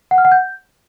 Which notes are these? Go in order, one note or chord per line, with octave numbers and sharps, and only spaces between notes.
F#5
F6
F#5
G6